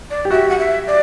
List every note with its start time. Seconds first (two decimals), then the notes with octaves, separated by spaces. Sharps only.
0.10 D5
0.25 G4
0.31 F#4 E5
0.49 F#5
0.59 E5
0.87 D5